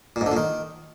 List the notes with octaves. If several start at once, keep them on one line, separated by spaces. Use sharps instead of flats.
A#2
G#2
D3
A#2
D#3